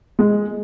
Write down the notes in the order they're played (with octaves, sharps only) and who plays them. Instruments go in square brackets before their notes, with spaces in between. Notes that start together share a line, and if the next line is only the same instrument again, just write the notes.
[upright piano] G#3